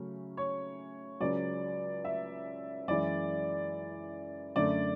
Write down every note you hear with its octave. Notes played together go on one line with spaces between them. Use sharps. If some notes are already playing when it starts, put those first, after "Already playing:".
Already playing: C#3 F#3 A3 C#4
C#5
C#2 C#3 F#3 D5
E5
F#2 E3 G#3 D5
F#2 D3 A3 D5